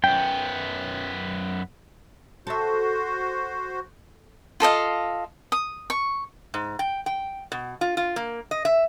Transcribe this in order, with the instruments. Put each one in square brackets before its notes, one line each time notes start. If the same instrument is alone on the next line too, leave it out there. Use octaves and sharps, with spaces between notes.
[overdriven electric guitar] F#2 B3 [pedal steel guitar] G5
[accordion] F#4 C5 [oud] A4 E5
[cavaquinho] F4 A4 D#5 F5
D#6
C#6
[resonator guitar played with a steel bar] G#2
G5
G5
B2
F4
F4
A#3
D#5
E5